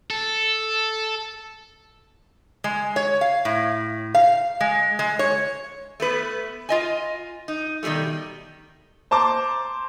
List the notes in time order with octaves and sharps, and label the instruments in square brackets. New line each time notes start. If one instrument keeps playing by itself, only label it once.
[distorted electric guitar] A4
[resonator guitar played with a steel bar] G#3
C#5
F5
A2
F5
G#3
G#3
C#5
A3 B3 B4
F4 D#5 G#5
D#4
B2 D#3 F3 G3 A3
[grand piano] C5 A5 A#5 D6